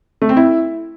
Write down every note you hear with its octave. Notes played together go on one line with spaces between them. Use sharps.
A3
C4
E4